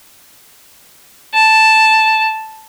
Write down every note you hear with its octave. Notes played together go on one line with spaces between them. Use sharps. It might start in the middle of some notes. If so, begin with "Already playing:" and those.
A5